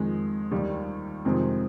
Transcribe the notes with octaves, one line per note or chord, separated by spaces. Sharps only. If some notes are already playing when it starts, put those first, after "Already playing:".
Already playing: F2 D#3 G#3
D#2 D#3 G3
F2 C3 D#3 G#3 C4